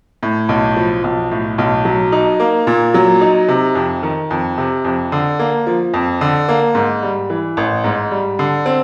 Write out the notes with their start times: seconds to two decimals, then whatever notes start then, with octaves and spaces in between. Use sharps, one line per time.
0.23 A2
0.49 B1
0.76 F3
1.04 B1
1.31 A2
1.58 B1
1.85 F#3
2.12 D#4
2.40 A#3
2.67 A#2
2.94 F#3
3.21 D#4
3.48 C3
3.75 F2
4.03 D#3
4.31 F2
4.58 C3
4.85 F2
5.12 D3
5.39 A#3
5.67 F3
5.94 F2
6.21 D3
6.49 A#3
6.75 G#2
7.03 G3
7.30 E3
7.57 A1
7.84 G#2
8.11 G3
8.39 D3
8.66 C4